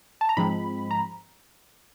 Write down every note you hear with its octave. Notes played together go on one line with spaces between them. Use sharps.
A5
A#5
G#2 F3 G#3 C4 B5
A#5